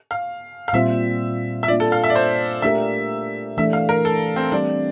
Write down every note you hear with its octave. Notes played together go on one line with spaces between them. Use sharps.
F5
F5
A#2 G3 C4 F4 C5 E5
E5
A#3 D4 F4 D5
A4
F5
E5
D5
C5
A3 D4 G4 A#4 E5
E3 A3 D4 E5
F5
A#4
A4
C4
G3 C4 D4 G4